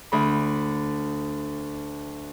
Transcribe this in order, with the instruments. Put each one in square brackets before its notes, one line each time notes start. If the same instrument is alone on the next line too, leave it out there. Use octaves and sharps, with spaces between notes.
[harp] D2 B5